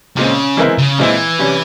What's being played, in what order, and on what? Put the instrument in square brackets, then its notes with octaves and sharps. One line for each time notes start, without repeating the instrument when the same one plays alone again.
[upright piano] A#2 G#3 C4 [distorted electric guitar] C#3
[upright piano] E3 G#3 C4 E4 A#4
[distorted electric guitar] C#3
[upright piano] A#2 G#3 C4 E4 [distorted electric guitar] E3
[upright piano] C3 G3 C#4